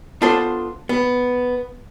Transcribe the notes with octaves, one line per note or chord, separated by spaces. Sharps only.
B3 D4 F4 A4 C5
B3